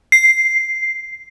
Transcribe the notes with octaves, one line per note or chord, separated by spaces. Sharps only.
C7